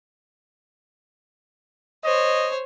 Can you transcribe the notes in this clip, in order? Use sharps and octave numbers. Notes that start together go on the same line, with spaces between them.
C5 C#5 D#5